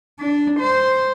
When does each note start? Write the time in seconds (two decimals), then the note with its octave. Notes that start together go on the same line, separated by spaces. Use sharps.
0.20 D4
0.60 C5